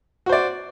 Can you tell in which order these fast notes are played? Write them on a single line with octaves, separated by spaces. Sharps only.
F#4 C5 D5